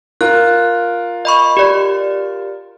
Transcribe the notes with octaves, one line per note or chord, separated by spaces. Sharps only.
F4 A#4 F#6
D#5 B5 C#6
G4 D5